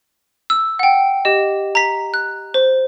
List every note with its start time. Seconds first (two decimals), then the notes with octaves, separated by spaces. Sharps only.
0.50 E6
0.79 F#5 G5
1.25 G4 D#5
1.75 A#5 B6
2.14 F#6
2.54 C5